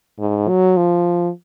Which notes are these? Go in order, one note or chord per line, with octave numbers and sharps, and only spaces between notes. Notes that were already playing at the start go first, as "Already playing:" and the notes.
G#2
F#3
F3